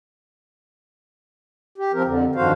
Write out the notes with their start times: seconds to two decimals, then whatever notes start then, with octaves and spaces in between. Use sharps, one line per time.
1.78 G4
1.93 F3 C4 A#4
2.05 F2 D3
2.35 G2 D#3 F3 F#4 C5 F5